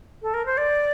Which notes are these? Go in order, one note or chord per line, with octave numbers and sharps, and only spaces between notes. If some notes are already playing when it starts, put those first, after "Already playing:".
A4
A#4
C5
D5